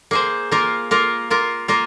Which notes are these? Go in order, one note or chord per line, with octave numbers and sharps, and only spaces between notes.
A#3 G#4 C5
A#3 F4 A#4
A#3 F4 A#4
A#3 F4 A#4
A#3 F4 A#4